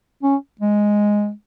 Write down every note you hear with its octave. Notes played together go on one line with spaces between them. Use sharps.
C#4
G#3